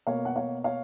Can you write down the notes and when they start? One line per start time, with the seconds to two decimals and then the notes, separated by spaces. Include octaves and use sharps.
0.07 B2 A#3 C#5 F5
0.25 F#5
0.36 C#5 F5
0.64 C#5 F5